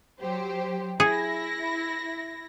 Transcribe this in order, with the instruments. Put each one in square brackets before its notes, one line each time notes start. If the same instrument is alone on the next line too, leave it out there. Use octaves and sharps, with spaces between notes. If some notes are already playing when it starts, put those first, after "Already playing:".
[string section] F#3 G4 C5
[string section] E4 A#6 [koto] G#4